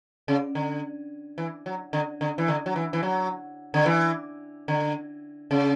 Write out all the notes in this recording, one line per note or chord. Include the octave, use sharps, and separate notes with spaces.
C#3
D3
E3
F#3
D3
D3
E3
D3
F#3
E3
E3
F#3
D3
E3
D3
C#3